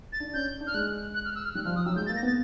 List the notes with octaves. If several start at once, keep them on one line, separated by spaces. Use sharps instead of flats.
A6
D4
C#4 G6
D4
F6
G#3 F#6
F#6
F6
E6
F6
G3 F#6
F3 F6
F3 D#6
F#3 E6
G#3 G6
A6
A#3
A#6
B3 A6